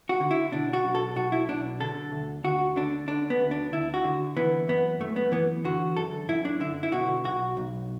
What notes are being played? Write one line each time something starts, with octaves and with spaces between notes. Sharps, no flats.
F#4
D3
E4
B2 D4
F#4
B1
A4
B1 F#4
E4
B2 D4
D3 A4
D2
D2 F#4
D3 D4
D3 D4
B3
D2
D4
D2 E4
F#4
D3
E3 B3
F#2 B3
F#2 A3
B3
E3 B3
D3 F#4
F#2 A4
F#2 E4
D4
D3 E4
E4
B2 F#4
B1 F#4
B1